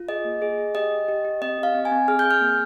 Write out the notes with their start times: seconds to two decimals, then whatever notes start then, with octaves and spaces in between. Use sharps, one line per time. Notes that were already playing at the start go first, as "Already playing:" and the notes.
Already playing: F4
0.09 G#4 D#5
0.25 A#3
0.42 G#4
0.58 G#4
0.75 G4 D#5
0.91 G4
1.08 G4
1.25 G4
1.42 C4 D#5
1.58 G4
1.63 F5
1.74 C4
1.85 G#5
1.91 C4
2.08 G#4 F6
2.19 G6
2.25 G#4
2.31 F6
2.41 A#3